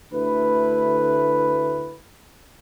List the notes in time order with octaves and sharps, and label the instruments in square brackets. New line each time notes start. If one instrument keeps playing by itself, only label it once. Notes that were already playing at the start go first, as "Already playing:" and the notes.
[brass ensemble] D2 D3 A3 E4 B4